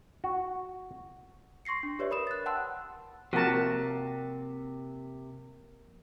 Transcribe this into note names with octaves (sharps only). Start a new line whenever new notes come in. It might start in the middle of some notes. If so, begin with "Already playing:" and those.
F#4
C6 C#6 A#6 C7 C#7
D4
G4 B4 C#5 D5 E5
A#4 B5 D#6 E7
F#6 A6
F#5 G5 A5 C6 E6 F#6
C3 F3 A#3 F#4 A#4 A5